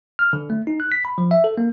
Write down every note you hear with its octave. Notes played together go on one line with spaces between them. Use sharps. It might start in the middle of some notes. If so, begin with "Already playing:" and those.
F6
D3
A3
D#4
F#6
B6
B5
F3
E5
A4
A#3